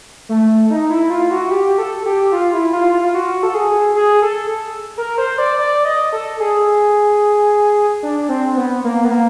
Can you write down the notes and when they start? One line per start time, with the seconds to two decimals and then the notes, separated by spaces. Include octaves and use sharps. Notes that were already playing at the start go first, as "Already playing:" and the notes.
0.29 A3
0.70 D#4
0.90 E4
1.10 F4
1.31 F#4
1.51 G4
1.78 A4
2.06 G4
2.32 F4
2.53 E4
2.73 F4
2.94 F4
3.05 F4
3.15 F#4
3.43 A4
3.55 G#4
3.96 G#4
4.22 A4
4.97 A#4
5.18 C5
5.38 D5
5.59 D5
5.85 D#5
6.13 A4
6.40 G#4
8.03 D4
8.29 C4
8.57 B3
8.84 A#3
9.05 B3
9.11 A#3